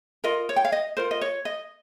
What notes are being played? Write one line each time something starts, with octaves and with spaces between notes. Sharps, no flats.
F4 A#4 D#5
C#5
G5
F5
D#5
F4 A#4 C5
D#5
C#5
D#5